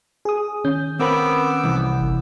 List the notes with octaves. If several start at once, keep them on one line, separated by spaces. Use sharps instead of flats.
G#4 D#6
D#3 C#4 G6
B3 C4 A#4 B4 D6 E6
C2 E3
G1